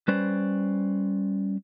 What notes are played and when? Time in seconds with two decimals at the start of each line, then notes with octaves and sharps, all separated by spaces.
0.08 G3 C#4 B4 C5 D5